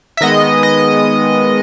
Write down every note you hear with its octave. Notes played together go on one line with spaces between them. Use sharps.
E5
D#3 G#3 B3 D#5
D#5